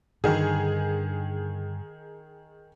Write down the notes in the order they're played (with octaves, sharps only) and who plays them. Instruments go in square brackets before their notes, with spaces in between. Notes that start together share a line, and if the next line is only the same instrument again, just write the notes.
[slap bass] G2 D3 [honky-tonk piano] D#3 G#4